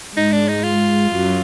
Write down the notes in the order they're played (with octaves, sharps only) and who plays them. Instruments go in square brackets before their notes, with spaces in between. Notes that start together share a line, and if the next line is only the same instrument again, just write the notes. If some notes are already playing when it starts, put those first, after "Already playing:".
[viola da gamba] G#2 G#3 [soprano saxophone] D#4
[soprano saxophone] D4
D#4
F4
[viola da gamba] F#2 F#3